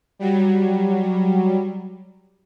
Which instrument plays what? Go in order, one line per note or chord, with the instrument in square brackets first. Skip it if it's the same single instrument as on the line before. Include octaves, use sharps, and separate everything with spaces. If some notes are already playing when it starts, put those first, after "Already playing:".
[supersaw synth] F#3 G3